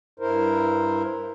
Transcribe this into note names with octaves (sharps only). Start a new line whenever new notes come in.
G2 E4 A#4 C5